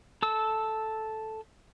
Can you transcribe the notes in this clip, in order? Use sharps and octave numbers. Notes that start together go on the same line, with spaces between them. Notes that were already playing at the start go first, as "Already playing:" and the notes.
A4 E6